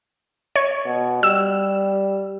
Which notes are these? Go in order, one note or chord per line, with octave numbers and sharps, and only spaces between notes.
C#5
B2
G3 E6